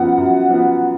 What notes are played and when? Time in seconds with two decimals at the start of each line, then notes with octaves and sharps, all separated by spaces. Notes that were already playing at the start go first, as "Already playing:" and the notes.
Already playing: F#2 F3 B3 F#5
0.17 F#2
0.50 F3 B3